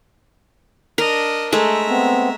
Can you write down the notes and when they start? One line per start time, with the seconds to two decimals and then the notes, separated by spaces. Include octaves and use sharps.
0.98 D4 A#4 D#5
1.52 G#3 A3 E5 A#5
1.89 B3 C4